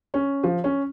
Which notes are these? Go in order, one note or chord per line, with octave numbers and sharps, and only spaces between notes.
C#4
F3
C#4